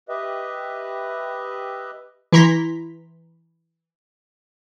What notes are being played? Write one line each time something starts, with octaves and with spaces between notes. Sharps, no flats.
G4 B4 D#5 E5
E3 E4 A#5 C6 A#6 B6